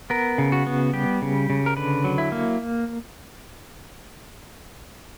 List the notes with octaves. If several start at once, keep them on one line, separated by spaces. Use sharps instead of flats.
B3 A#4
C#3
F#4
B3
G3 G4
C#3
C#3
A#4
D3 B4
F#3
E4
A#3